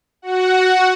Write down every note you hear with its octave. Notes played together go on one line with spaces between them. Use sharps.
F#4 F#5